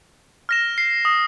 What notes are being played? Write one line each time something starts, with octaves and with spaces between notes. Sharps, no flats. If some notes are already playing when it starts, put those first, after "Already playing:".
F6 A#6 E7
C7
D#6